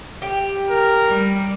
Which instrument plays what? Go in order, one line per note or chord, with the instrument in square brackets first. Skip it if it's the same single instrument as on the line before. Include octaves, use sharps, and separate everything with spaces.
[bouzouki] G4
[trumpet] A#4
[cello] G3